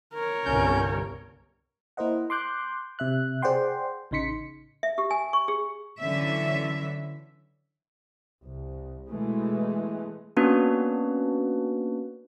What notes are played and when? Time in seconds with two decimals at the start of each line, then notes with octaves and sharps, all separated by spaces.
0.14 A#4 C#5
0.46 G1 C2 C#4 G6
1.97 A#3 E4 A#4 C5 D#5 F#5
2.30 C6 D6 F#6 G6
2.99 C3 E5 F#6
3.42 G#4 C5 D5 F#5 G5 C6
4.11 A1 C#3 D#4 C6 B6 C#7
4.83 E5
4.98 G4
5.11 G#5
5.33 C#6
5.48 G#4
6.00 D3 E3 F#3 C#4 E5
8.42 C2
9.08 B2 E3 G#3 A3
10.37 A#3 B3 C#4 D4 F#4 B4